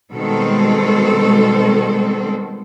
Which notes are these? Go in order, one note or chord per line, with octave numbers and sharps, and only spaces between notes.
B2 D#3 G3 G#3 C4 A4